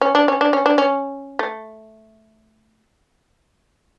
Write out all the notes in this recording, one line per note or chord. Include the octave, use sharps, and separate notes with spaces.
C#4
D4
C#4
D4
C#4
D4
C#4
A3